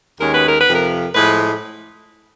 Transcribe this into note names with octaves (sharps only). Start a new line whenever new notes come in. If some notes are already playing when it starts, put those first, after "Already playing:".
D#2 D#3 G#3 C#4 A#4
B4
A#4
B4
F2 C3 F3
A#4
A2 F3 G#3 B4